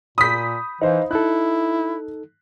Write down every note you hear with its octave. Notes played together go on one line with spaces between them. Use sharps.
A#2 B5 D#6 G6 B6
E3 D#4 C5 F5
D#4 E4 A4 F#6